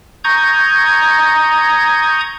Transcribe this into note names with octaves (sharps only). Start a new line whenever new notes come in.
A#5 C#6 D#6 G6 G#6